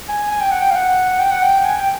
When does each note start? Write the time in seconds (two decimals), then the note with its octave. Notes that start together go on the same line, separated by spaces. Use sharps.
0.09 G#5
0.31 G#5
0.41 G5
0.51 F#5
0.61 G5
0.71 F5
0.76 F#5
1.20 G5
1.31 F#5
1.42 G5
1.64 G#5
1.76 G5